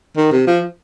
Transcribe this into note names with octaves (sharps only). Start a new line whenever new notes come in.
D#3
C3
F3